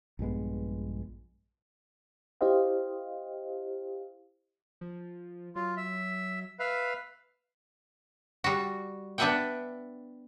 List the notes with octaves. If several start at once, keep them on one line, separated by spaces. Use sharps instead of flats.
A#1 G2 G#3 B3
E4 G4 C5 D#5 F5
F3
F#3 F4
E5
B4 E5 F5
G3 F#4
B3 D4 B4 E5 F#5 G5